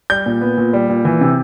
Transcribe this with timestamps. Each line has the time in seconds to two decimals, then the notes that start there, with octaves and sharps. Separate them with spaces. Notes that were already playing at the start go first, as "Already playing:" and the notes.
0.10 G3 G6
0.26 A#2
0.41 B3
0.57 A#2
0.73 G3
0.90 A#2
1.05 E3
1.21 C3